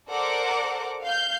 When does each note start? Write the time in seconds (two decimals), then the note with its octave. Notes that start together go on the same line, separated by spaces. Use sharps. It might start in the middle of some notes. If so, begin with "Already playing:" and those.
0.10 A4 A#4 C5 D5 F#5 D6
1.02 F5 G6